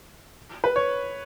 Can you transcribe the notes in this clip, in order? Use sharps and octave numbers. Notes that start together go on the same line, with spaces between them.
B4
C#5